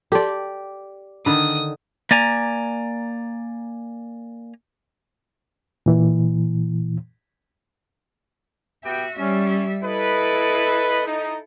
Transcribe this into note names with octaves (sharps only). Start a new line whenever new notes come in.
G4 A4 D5 A5 C6
D3 D#3 A#5 B5 D#6
A#3 D5 G#5 A#5
A#2 E3
B3 F#4 G4 E5 G5
G3 C#4 E5
E4 A4 B4 D#5
D#4